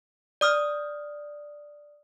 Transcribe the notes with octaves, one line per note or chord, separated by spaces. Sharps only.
D5 D#6 F6